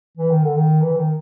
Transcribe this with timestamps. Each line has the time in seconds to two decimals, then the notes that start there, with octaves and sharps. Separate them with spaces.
0.17 E3
0.31 D#3
0.44 D3
0.56 D#3
0.81 E3
0.92 E3
0.97 D#3